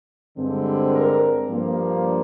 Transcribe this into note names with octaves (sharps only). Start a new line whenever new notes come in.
G2 D3 G#3 C4
A#4
G2 F3 A#3 D4